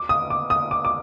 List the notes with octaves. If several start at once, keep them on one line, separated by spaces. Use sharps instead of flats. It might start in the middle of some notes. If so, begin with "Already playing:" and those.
Already playing: D6
D#6
D6
D#6
D6
D6